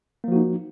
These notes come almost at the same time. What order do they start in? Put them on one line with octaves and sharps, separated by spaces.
A#3 F3 F#4 D#4